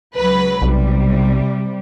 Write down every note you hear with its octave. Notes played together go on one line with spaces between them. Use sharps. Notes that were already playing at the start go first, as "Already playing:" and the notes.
C#2 F#3 B4
B1 C3 G3